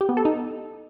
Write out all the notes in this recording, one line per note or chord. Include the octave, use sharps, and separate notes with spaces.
G4
B3
A4
D#4